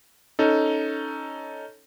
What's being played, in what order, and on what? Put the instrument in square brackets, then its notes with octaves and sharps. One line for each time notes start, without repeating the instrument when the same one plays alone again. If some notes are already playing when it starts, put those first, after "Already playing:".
[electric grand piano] C#4 D#4 A4